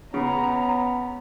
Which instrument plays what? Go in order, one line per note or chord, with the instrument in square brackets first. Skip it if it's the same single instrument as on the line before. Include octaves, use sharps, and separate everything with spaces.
[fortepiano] C#3 [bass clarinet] B3 [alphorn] C#5 [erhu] A#5